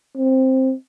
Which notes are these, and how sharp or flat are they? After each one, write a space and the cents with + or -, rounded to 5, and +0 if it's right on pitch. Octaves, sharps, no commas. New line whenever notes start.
C4 +5